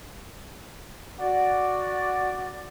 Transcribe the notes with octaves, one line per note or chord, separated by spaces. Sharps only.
F#4 D5